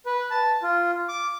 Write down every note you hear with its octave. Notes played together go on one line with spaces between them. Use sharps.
B4
A5
F4
D6